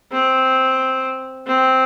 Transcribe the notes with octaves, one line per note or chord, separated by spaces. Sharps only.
C4
C4